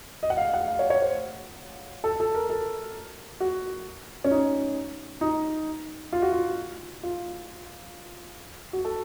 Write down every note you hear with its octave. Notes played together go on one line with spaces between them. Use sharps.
D#5
F#5
F5
F#5
F5
C#5
C#5
C5
A4
A4
A#4
A4
F#4
C#4
D#4
D#4
F4
F#4
F4
F4
F#4
A4